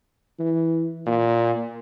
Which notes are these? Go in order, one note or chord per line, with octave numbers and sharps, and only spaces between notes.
E3
A#2